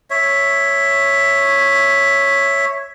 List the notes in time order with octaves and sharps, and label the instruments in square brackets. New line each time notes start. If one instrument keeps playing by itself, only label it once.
[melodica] C#5 E5